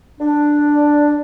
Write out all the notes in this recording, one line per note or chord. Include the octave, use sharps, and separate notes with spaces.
D4